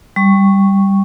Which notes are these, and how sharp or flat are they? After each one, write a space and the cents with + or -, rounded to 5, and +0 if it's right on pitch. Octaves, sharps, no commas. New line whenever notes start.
G3 +0 C#6 -5